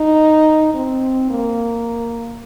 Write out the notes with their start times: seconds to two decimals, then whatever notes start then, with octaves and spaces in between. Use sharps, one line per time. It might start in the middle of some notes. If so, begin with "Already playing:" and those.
Already playing: D#4
0.74 C4
1.30 A#3